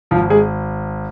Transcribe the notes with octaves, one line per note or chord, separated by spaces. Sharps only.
G#1 F3 F4
G#3 G#4